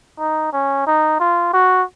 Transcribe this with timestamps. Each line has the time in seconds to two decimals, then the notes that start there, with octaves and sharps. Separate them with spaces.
0.19 D#4
0.53 C#4
0.86 D#4
1.20 F4
1.53 F#4